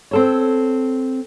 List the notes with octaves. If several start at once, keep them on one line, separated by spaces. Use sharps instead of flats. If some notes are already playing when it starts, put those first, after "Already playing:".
C4 A4 C#5